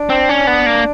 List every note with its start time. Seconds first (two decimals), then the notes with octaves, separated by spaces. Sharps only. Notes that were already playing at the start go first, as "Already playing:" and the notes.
Already playing: D4
0.10 C4
0.29 C#4
0.47 B3
0.66 A#3